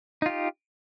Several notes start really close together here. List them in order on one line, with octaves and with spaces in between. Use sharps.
D#4 F4 G4